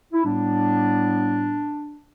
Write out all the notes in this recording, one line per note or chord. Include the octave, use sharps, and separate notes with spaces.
E4
A2 G3 B3 D4